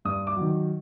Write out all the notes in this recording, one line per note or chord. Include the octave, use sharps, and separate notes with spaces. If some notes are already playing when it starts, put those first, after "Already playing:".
G2 D#6
D6
D#3 F#3